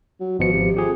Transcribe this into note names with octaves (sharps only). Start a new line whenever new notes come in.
F#3
G#1 B2 F3 C#7
C3
F2 G4 G#4